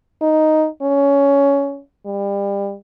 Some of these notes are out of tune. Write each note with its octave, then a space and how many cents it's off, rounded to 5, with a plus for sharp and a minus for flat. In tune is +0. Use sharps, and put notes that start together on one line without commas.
D#4 +0
C#4 +15
G3 +30